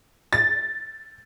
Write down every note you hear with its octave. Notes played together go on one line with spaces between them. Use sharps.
A6